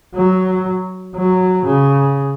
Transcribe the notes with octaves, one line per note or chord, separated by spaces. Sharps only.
F#3
F#3
C#3